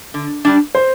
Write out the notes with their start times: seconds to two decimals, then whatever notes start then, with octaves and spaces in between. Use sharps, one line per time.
0.14 D3
0.45 G3 D4
0.75 C5